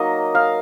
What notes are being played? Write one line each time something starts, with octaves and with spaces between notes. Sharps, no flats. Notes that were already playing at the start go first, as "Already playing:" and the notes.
Already playing: F#3 A#3 D#4 D#5
F5